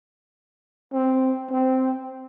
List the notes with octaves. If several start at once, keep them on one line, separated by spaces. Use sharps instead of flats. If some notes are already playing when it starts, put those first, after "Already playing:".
C4
C4